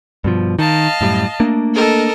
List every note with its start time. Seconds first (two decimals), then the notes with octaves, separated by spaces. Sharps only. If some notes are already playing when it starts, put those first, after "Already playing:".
0.24 G2 B2 F3
0.59 D#3 D#5 F5 A5
1.01 F#2 A2 G3
1.40 A3 A#3 D4
1.74 A4 A#4 D#5